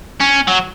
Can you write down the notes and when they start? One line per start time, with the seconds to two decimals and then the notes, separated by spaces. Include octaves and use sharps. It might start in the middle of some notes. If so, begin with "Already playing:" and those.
0.21 C#4
0.48 F#3